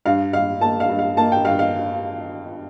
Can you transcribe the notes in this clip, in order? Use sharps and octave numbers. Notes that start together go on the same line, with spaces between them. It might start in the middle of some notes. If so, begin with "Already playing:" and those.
G2 F5
G2 F5
A#3 A5
F5
G2
F5
A#3 A5
G5
G2 F5
F5